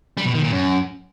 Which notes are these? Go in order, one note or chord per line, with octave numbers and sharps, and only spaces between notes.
G3
B2
D#3
A#2
F#2